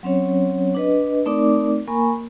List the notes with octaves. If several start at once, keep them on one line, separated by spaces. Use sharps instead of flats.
F#3 C4 C#4 C#5
D4 B4 D#5
A3 C4 D#4 A#4 D5 D6
A#3 A#4 G#5 B5 C#6